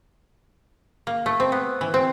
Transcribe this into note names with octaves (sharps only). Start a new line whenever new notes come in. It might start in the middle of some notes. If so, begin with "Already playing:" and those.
A#3
A3
C4
B3
E3
C4